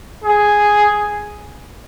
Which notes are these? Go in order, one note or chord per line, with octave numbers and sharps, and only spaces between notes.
G#4